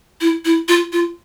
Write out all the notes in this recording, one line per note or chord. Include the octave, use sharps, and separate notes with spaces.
E4
E4
F4
F4